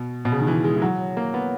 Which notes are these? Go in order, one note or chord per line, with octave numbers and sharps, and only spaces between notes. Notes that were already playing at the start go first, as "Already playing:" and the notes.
Already playing: B2
B2
C#3
D#3
E3
G#3
E3
F#3
A#3
B3